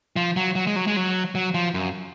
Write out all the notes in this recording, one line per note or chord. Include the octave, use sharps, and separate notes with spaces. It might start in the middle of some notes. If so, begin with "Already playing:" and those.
F3
F#3
F#3
G#3
F#3
G#3
F#3
F#3
F3
F#2